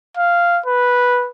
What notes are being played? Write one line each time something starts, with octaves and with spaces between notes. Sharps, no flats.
F5
B4